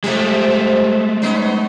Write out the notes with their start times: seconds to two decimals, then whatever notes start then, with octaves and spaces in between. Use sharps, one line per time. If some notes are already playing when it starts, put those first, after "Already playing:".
0.04 C3 F3 G#3 A3 G4
1.22 B3 C#4 D#4